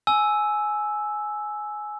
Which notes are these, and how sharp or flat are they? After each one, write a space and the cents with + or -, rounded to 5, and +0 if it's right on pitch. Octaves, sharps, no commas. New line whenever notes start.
G#5 +15 E6 -5